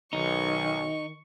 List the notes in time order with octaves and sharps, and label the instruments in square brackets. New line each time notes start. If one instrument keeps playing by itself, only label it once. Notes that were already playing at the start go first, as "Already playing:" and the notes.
[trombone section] B1 [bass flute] D#3 [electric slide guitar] D#4 [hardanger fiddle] C#6